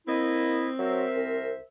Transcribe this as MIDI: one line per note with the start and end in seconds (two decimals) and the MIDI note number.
0.08 0.68 58
0.08 1.40 60
0.08 0.69 64
0.08 0.69 75
0.79 1.05 54
0.79 1.63 70
0.79 1.63 72
0.79 1.63 76
1.16 1.55 36